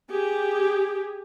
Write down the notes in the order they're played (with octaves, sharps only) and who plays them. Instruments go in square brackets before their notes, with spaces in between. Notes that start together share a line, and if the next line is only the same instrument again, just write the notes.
[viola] G4 G#4